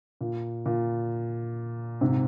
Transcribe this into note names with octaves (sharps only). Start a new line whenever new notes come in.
A#2
A#2
G#2 C3